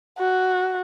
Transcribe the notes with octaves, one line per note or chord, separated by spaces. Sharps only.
F#4